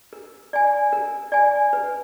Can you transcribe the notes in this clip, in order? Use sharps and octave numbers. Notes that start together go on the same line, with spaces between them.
A#4
D5 G#5
A#4
D5 G#5
B4